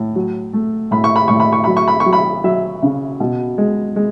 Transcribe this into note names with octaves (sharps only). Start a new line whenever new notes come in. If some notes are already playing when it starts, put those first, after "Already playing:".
Already playing: A2
F#3
A3
A2 B5
C#6
B5
A2 C#6
B5
C#6
F#3 B5
C#6
B5
C#6
F#3
B5
F#3 E5
C#3
B2
G#3
G#3